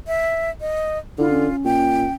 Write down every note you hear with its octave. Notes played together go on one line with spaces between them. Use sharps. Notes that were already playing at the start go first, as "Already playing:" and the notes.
E5
D#5
D3 E4 F4
C#4
A#2 G5